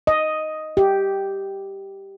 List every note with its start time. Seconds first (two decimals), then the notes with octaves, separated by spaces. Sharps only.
0.07 D#5
0.77 G4